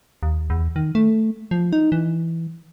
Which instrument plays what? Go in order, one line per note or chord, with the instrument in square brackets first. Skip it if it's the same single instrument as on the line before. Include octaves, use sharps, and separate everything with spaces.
[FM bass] D#2
E2
D#3
A3
F3
D#4
E3